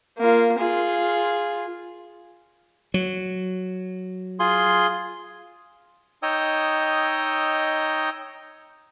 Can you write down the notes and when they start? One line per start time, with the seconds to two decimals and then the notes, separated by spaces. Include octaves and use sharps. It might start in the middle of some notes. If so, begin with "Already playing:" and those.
0.18 A#3 F4
0.58 F4 G#4
2.94 F#3
4.40 F4 G#4 C6
6.23 D#4 C#5 D#5 G5 D#6 E6